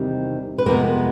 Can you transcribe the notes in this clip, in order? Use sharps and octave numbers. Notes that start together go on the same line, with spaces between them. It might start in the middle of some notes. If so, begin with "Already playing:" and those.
Already playing: E2 C3 D#3 G3 C4
B4
F2 C3 F3 G#3 A#3 B3 A#4